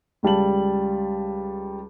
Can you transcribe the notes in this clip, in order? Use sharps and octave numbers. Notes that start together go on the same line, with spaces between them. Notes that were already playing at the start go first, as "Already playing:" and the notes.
C#2 G3 A5 F#7